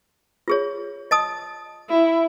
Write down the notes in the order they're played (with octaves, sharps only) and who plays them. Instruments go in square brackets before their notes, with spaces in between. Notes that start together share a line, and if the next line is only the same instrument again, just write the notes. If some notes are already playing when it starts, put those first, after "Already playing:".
[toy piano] F4 G#4 C#5
D#5 A5 D#6
[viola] E4